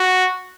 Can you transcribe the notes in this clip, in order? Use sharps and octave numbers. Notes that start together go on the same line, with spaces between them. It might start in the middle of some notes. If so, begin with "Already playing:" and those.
Already playing: F#4